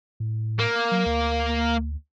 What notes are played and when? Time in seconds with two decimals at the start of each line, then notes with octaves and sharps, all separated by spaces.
0.20 A2
0.59 A#3
0.92 F#3
1.06 D2